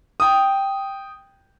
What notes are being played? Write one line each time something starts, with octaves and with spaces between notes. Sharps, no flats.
G5 D#6